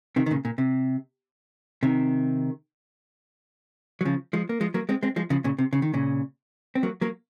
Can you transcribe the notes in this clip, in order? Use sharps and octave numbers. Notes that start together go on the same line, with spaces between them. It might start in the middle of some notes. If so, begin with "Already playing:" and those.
C3 D#3
D#3
A#2 C#3
A#2
C3
C3 D#3
F#3
C#3 F3
F3 G#3
A#3
F3 G#3
F#3 A#3
G#3 C4
G#3 C4
F3 G#3
C#3 F3
A#2 C#3
C3
C#3
D#3
A#2 C#3
C4
F#3 A#3
F#3 A#3